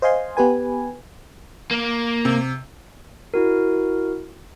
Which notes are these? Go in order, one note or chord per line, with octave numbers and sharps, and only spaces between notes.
C5 D#5 F5 G#5 C6
B3 G4 B4 G#5
A#3
C3
E4 F#4 A#4